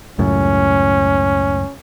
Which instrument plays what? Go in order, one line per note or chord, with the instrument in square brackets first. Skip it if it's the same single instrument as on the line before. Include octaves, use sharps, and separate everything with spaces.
[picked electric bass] C#2 F#2 A2 [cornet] C#4